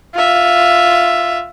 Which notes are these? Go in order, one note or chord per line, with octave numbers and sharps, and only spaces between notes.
F4 E5